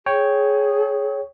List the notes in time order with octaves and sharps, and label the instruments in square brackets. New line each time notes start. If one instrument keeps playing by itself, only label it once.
[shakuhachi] G#4 [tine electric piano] C#5 G5